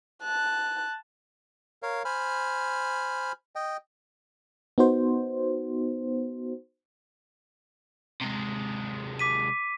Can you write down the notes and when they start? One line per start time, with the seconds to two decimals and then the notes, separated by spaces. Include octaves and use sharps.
0.23 A5 F#6
1.83 A#4 C#5 F5
2.05 C5 G#5 B5 F6
3.56 D#5 G5
4.78 B3 D#4 F#4 C5
8.21 C3 G#3
9.19 D6 B6 D#7